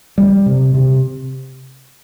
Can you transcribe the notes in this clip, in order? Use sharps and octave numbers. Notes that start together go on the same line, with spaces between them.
G3
C3
C3